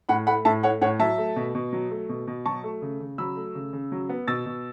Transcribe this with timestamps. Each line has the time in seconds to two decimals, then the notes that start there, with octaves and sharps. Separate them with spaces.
0.09 A2 F#5 B5
0.27 A3 F#5 B5
0.45 A2 E5 A5
0.63 A3 C#5 F#5
0.81 A2 C#5 F#5
0.99 F#3 E5 A5
1.18 A3
1.36 B2
1.55 B2
1.73 F#3
1.91 A3
2.09 B2
2.27 B2
2.46 F#3 A5 C#6
2.64 A3
2.82 C#3
3.00 C#3
3.18 F#3 B5 E6
3.36 A3
3.55 C#3
3.73 C#3
3.92 F#3
4.09 B3
4.28 B2 E6 A6
4.46 B2